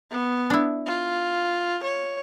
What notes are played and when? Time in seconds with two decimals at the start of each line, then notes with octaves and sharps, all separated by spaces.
0.11 B3
0.50 D4 E4
0.87 F4
1.83 C#5